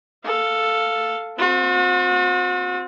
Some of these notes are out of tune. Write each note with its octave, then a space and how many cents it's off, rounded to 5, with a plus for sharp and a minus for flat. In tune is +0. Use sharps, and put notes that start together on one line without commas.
A4 +5 F5 +0
C4 +5 F#4 -40